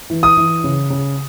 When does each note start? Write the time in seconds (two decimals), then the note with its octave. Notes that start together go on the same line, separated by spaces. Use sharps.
0.10 E3
0.23 D#6
0.37 E3
0.64 C#3
0.90 C#3